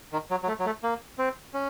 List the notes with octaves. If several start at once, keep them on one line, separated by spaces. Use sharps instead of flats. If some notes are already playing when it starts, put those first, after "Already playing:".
D#3
F#3
F#3
A3
F#3
A3
A#3
C4
C#4